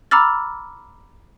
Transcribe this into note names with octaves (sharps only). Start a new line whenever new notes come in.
A#5 B5 D6 E6 F6 A6